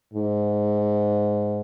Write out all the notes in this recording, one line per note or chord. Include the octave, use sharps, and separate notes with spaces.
G#2